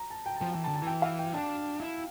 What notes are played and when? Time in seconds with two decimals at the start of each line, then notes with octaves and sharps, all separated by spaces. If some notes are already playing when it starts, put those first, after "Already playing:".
Already playing: A#5
0.10 A5
0.26 G5
0.36 A5
0.41 F3 G5
0.53 E3 G5
0.64 A5
0.68 D3
0.76 A5
0.82 E3 G5
1.02 F5
1.19 G5
1.33 D4 A5
1.80 E4